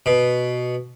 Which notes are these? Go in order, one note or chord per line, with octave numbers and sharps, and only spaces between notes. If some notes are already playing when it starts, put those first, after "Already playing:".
B2